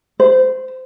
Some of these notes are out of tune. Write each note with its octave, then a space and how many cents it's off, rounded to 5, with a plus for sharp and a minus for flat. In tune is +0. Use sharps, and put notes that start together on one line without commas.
C5 -20